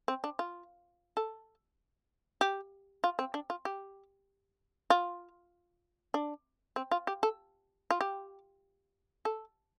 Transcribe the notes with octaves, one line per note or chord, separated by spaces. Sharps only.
C4
D4
F4
A4
G4
F4
C4
D4
F4
G4
F4
D4
C4
F4
G4
A4
F4
G4
A4